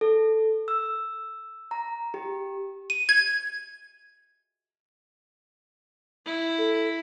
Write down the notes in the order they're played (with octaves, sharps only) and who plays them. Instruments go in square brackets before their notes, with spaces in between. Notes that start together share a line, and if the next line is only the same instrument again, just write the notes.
[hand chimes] A4
E6
A#5
G4
[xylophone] D#7
G#6
[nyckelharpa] E4
[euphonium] A4